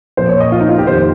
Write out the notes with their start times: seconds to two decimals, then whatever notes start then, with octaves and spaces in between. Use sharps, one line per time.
0.17 A#2 F3 A#3 C5
0.29 C#5
0.40 D#5
0.52 F4
0.60 D#4
0.69 F4
0.78 G4
0.87 F2 D#3 A#3 C5